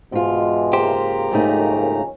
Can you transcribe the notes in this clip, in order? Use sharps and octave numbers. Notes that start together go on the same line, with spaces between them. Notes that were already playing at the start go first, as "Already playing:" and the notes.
G#2 B2 E3 G#3 F4
C#3 A#3 G4 C5 A#5
A#1 D#2 G#2 A3 C#4 D#4